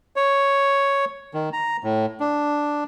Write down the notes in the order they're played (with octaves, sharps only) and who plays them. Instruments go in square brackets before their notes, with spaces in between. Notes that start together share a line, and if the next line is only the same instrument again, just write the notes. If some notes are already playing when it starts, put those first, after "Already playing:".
[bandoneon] C#5
D#3
A#5
A2
D4